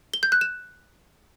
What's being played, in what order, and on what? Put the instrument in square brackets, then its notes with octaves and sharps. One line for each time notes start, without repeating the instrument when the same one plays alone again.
[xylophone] G7
G6
F#6
E7